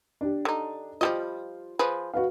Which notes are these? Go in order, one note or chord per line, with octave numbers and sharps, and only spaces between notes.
D4 G4
D3 D#4
F3 G3 F4 D#5
F3 G#4 B4
F#4 B4 F5